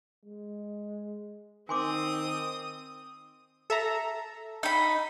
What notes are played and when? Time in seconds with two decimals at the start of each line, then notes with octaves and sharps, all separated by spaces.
0.25 G#3
1.69 D#3 C4 G#5 C6 D6 D#6
3.70 A4 E5 A#5
4.63 D#4 B5